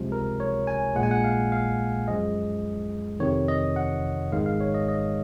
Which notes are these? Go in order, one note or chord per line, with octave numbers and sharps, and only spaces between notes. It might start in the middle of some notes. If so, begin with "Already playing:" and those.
Already playing: C#2 C3 F3 G#3
A#4
C#5
G#5
A#1 A#2 G#3 F#5
G#5
F#5
F5
F5
F#2 F3 G#3 D#5
F2 C3 D#3 C#5
D#5
F#5
G#1 G#2 D#3 G#3 F5
F5
C#5
D#5
D#5